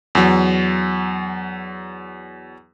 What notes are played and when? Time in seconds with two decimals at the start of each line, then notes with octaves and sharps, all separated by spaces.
0.15 E2 F#3